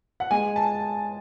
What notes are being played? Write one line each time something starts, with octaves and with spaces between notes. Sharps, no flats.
F#5
G#3 G#5
A5